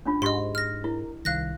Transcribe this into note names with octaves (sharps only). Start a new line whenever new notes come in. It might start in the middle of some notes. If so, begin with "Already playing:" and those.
C#4 D4 F4
G#2 G4 D#5 C6
F6 A#6
E4 A#4
C2 D#3 F5 F#6 A#6